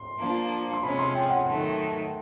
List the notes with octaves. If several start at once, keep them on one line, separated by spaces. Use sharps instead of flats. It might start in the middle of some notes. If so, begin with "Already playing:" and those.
Already playing: C6
F3 A#3 D4
C6
C3 F3 G#3 C#4 B5
C6
G5
F#5
D#3 F#3 A3